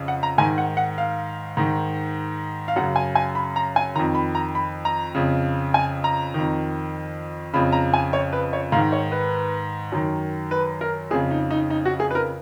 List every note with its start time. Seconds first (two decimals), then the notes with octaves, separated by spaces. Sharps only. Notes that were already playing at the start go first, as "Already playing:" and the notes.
Already playing: F2 C#3
0.08 F#5
0.23 A#5
0.38 G#2 D#3 G#5
0.58 F#5
0.77 F#5
0.98 F5
1.57 G#2 D#3
2.68 F5
2.76 F#2 C#3 F#5
2.96 G#5
3.15 G#5
3.35 B5
3.56 A#5
3.76 G#5
3.95 D#3 A#5
3.99 F2
4.15 B5
4.35 A#5
4.55 B5
4.85 A#5
5.15 F2 C#3
5.74 G#5
6.04 A#5
6.34 F2 D#3
7.54 F2 C#3 B5
7.72 A#5
7.94 G#5
8.13 C#5
8.33 B4
8.53 C#5
8.72 G#2 D#3 F5
8.92 C#5
9.12 B4
9.92 F#2 D#3
10.51 B4
10.81 A#4
11.11 F2 G#4
11.14 C#3
11.31 D#4
11.51 D#4
11.70 D#4
11.85 F#4
12.00 G#4
12.11 B4
12.15 A#4